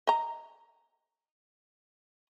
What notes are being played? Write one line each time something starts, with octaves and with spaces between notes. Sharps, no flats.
D#5 A#5